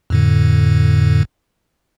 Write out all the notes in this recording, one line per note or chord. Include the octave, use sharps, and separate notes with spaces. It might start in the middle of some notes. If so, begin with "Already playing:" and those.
F2 A2 D3